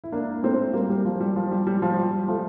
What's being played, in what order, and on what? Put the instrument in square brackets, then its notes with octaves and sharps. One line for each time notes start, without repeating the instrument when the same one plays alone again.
[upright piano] E4
A#3 D4
A3 C4
G3 A#3
G3
F3
G3
F3
G3
G3
F3
G3
F3 A3